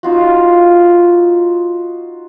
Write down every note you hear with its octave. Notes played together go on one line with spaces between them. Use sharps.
D#4 F4 F#4